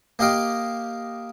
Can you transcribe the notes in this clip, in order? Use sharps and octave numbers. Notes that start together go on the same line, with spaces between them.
A#3 G4 D#5 F5 G5